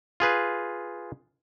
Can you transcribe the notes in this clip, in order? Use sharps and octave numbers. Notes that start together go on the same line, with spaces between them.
F4 G#4 B4